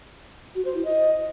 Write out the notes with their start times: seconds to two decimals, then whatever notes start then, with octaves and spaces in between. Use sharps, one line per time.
0.55 F#4
0.65 C5
0.75 E4
0.85 D#5